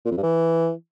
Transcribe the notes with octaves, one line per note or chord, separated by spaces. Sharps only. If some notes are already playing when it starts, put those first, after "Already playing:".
A#2
F2
G2
E3